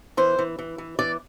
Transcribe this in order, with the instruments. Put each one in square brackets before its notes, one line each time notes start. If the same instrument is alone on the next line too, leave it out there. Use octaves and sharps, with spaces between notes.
[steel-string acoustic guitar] E3 C5
E3
E3
E3
E3 D5